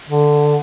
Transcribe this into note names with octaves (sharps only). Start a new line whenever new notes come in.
D3